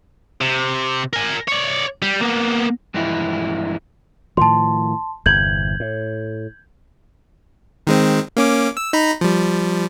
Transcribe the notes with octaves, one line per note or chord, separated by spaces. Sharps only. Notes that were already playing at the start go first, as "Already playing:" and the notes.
C3
A#4 G#5
C#5 D5
G3
A#3 B3
G2 E3 F3 G#3 E4
A2 D#3 F3 A5 C6
G1 E2 C3 G6 G#6 F#7
A2
D#3 G#3 C4
A#3 C#4 D6
E6
D#4 A#5 B5
F3 G3